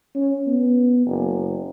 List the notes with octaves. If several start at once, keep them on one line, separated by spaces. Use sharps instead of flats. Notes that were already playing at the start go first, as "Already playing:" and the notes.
C#4
B3
F#1